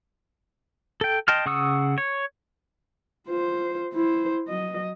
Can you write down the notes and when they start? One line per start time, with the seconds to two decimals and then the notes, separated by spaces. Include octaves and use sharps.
1.01 A4 G5
1.28 D#5 G5 A5 C6 F6
1.46 C#3 F#5 C#6 D#6 E6
1.98 C#5
3.27 F4 C5
3.93 E4 C5
4.48 F#3 D#5